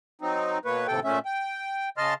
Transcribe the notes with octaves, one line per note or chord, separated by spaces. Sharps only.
F#3 C4 D#4
B2 A#3 B4 C#5
D#2 A2 C3 A4 G5
A#2 A3 C#4 E5
G5
C#3 D#5 A5 C6 F6